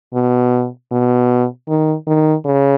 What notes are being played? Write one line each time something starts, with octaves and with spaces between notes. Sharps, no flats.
B2
B2
D#3
D#3
C#3